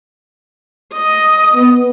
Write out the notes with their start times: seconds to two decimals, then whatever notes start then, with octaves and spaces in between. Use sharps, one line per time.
0.92 D#5
1.54 B3